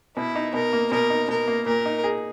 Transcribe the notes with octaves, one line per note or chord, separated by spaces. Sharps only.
B2 E4
D#4
B2 A#4
A#3
B2 A#4
D#4
B2 A#4
A#3
A#2 A#4
D#4
G#4